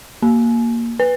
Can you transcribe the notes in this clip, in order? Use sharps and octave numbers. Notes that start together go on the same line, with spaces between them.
A#3
B4